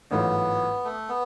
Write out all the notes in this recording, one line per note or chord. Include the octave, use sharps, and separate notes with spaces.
A1 G#2 F#3 A3 B3 F4
A3
B3